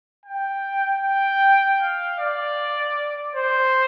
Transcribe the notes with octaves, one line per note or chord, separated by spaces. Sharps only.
G5
G5
F5
D5
C5